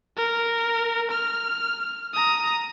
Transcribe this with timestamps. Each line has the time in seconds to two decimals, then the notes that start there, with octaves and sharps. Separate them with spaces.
0.17 A#4
1.11 F6
2.14 A#5 D#6